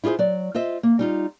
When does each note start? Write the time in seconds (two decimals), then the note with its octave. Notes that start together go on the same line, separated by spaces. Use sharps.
0.04 E4 F4 G4 G#4 C5
0.19 F#3 D5
0.55 F4 C5 D#5 E5
0.83 A#3
0.99 G3 D#4 F4